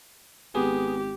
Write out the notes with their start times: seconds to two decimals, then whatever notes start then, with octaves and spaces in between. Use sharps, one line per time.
0.55 G#1 B3 G4 G#4